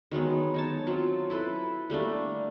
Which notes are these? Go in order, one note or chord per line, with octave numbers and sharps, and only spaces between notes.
D#3 F#3 G#3 B3
D#4 C#5 A5
F#3 C4 F4
E4 A4 B4 C6
G3 A3 A#3 D4